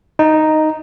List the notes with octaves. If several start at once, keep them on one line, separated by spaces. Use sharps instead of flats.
D#4